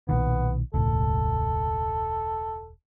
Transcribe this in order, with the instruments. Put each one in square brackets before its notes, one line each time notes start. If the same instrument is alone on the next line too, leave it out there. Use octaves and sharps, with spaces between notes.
[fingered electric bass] B1 A#2 D#3 [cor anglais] B3
[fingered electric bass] E1 C#2 A2 [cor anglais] A4